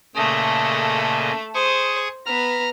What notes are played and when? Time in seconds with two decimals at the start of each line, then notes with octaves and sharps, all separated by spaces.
0.15 A#2 C#3 A3 A4 D#5
1.54 G#4 C5 C#6 D#6
2.26 B3 B4 A#5 F6